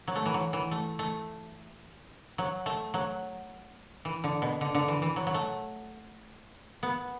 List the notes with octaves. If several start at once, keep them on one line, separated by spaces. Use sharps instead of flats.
F#3
A3
E3
F#3
E3
A3
A3
F#3
A3
F#3
E3
D3
B2
D3
D3
E3
E3
F#3
F#3
A3
B3